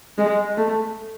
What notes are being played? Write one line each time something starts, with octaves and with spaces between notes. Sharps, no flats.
G#3
A3